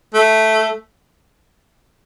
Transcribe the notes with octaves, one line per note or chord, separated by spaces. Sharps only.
A3